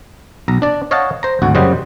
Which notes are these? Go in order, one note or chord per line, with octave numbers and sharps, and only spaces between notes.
B1 A#5
D4 D5
C#5 D#5 F5 F#5 A5
C5 A#5
G#1 D2 F#4
F#2 C#3 G3 C5 D#5 F#5